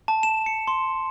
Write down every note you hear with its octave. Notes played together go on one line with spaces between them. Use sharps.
A5
E7
C#7
C6